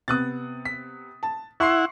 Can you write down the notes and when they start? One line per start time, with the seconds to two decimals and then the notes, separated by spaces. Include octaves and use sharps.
0.08 C3 B3 D#6 F#6 A6
0.65 B6
1.23 A5
1.60 E4 E5 F#5 C6 C#6 C7